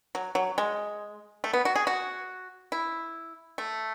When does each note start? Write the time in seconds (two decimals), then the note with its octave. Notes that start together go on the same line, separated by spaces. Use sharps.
0.15 F#3
0.35 F#3
0.58 G#3
1.44 A3
1.53 B3
1.65 F#4
1.76 G#4
1.87 F#4
2.72 E4
3.58 A3